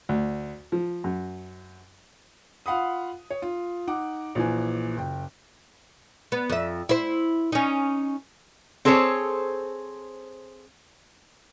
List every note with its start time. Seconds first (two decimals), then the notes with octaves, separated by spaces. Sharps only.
0.09 D2
0.72 F3
1.04 F#2
2.66 F4 F5 F#5 B5 D#6
3.30 C#5
3.42 F4
3.87 D#4 F#5 D6
4.35 A#1 E3 G#5
4.97 F#1 G5
6.32 B3
6.50 F2 E5
6.89 E4 C5
7.52 C#4 D#4
8.85 C4 G#4 A4 C5 C#5